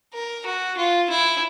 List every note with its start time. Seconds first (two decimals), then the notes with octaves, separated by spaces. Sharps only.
0.13 A#4
0.46 F#4
0.77 F4
1.10 E4